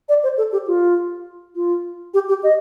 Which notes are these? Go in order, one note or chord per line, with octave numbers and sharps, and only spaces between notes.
D5
C5
A4
G4
F4
F4
G4
G4
D#5